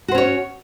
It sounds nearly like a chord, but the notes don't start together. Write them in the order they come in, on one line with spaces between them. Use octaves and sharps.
F#4 C5 C#4 C#5